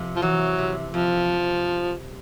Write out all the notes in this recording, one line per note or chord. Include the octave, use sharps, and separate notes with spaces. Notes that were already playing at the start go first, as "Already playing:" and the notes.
Already playing: F2 C3
F3
E3 F#3
C3
F2 F3